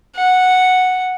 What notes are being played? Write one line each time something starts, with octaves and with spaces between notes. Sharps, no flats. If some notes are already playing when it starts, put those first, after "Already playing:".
F#5